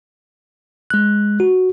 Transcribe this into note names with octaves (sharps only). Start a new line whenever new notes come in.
G#3 F#6
F#4